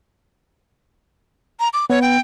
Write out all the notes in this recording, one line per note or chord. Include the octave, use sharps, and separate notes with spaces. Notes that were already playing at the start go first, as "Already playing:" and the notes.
A#5
D6
B3 C#5
G5